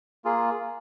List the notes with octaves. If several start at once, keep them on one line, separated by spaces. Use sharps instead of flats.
A#3 F4 G#4